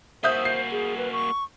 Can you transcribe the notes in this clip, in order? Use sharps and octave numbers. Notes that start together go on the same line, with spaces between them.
A#3 F#4 C5 E5 D#6 G6
C7
G#4
B4
C#6